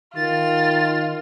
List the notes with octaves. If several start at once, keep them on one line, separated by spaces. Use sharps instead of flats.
D#3 F4 A6